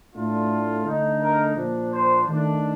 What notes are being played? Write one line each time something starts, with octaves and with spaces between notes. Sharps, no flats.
A2 A3 D4 F4
D3 A3 D#4
A#4
A#2 F3 A#3 D4
C5
D#3 A3 D4